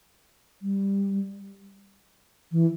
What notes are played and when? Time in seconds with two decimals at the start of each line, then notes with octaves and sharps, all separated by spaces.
0.62 G3
2.52 E3